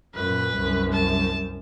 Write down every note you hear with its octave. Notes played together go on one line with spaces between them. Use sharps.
F#2 A#2 B4
C2 F#2
A5